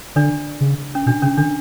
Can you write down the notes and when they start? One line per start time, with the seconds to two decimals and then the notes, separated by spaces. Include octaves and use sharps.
0.16 D3 D4 D5
0.61 C#3
0.95 C#4
1.06 B2 D4
1.22 C#3 C#4
1.37 D3 D4